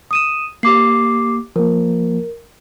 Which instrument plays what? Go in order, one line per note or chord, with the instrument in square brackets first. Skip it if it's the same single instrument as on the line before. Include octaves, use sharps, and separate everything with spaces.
[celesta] D#6 D#7 E7
[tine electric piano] A#3 [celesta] G4 D6 C7
[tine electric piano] F3 A#3 [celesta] A#4